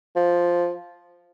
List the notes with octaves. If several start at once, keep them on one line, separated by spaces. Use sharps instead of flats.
F3